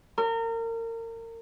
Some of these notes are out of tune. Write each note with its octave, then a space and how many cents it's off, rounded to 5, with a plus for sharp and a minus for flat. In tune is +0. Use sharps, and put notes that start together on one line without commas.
A#4 -30